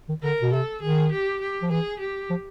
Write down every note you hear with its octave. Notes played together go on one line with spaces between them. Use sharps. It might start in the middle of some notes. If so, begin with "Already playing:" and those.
D#3
D3 A#4
B2
C3 A4
D#3 G#4
G4
G4
F3
E3 G#4
G4
F3